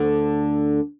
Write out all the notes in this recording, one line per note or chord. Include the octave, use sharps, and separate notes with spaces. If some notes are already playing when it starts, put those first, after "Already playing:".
Already playing: D2 D3